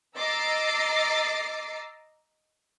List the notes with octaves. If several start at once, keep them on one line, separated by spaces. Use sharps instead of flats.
D#5 A#5 D6 E6 A6 C7